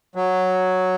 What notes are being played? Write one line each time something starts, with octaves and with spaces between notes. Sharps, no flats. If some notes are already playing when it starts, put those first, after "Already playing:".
F#3